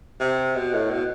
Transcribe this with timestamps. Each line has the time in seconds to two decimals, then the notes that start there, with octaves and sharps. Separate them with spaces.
0.20 C3
0.56 B2
0.74 A2
0.91 B2